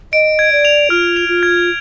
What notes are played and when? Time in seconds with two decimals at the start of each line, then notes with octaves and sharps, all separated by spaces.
0.13 D#5 D7
0.39 G#6
0.52 D5
0.65 F7
0.90 F4 F6
1.16 F7
1.29 F4
1.43 G#6